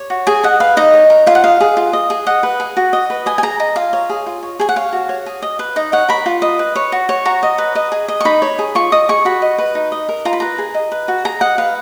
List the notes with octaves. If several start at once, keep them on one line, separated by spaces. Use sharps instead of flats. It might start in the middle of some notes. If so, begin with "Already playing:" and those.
Already playing: C#5
F#4
G#4 G#5
D#5 F#5
B4 F5
D#4 D#5
C#5
A#4
F4 F5
F#5
D#5 F5
G#4
F4
D#5
G#4
D#5 F#5
B4
G#4
F#4
D#5
B4
D#5 G#5
G#5
G#4 A#5
D#5 A#5
F4 F5
C#5
G#4
F4
C#5
G#4 G#5
F#5
C#5 F5
F#4
C#5
G#4
D#5
B4
D#4 D#5
C#5 F#5
A#4 B5
F4
D#5
B4
C#5
F#4
C#5
F#4 A#5
D#5
B4
D#5
G#4
D#5
C#6
D#4 B5
C#5
G#4
F4 C#6
D#5 D#6
G#4 C#6
F#4 B5
D#5
B4
D#4
D#5
A#4
F4 A#5
B5
B4 A#5
G#4
D#5
B4
F#4
G#4 A#5
D#5 F#5
B4 F5